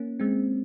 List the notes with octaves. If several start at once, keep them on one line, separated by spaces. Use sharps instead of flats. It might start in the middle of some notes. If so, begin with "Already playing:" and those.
Already playing: A#3 C#4
G#3 C4